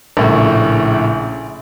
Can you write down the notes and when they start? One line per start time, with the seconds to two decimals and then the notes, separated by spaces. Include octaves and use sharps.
0.17 A#1 A2 C#3